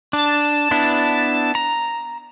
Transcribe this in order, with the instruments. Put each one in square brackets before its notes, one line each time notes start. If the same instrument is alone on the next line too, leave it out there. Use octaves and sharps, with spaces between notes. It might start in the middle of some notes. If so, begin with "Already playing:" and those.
[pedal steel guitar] D4 [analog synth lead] A5
[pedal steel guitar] B3 D4 E4
A#5